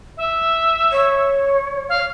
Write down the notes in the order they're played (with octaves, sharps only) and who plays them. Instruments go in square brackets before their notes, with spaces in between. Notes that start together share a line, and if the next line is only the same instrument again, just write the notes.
[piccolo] E5
[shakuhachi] C#5
[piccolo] F5